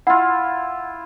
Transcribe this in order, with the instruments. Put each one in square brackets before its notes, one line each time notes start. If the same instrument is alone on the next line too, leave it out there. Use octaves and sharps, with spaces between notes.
[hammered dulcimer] E4 F4 [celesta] F#5